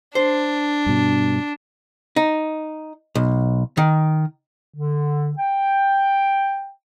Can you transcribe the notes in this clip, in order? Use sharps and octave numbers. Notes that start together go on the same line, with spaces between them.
D4 C5
G2 B2
D#4
B1
D#3
D3
G5